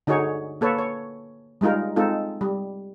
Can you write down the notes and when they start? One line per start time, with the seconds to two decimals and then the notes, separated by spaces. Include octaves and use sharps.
0.07 D3 D#4 F#4 G#4 C#5
0.61 A#3 A4 B4 C#5
0.79 C#5
1.61 G3 G#3 D#4 F4 A#4
1.96 G#3 C4 D#4 F4 A4
2.41 G3